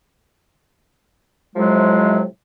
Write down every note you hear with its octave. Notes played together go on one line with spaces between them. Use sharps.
A2 C3 F3 F#3 G#3